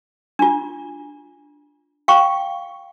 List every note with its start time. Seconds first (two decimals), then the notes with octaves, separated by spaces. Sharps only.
0.39 D4 F4
2.08 F5 G5 C#6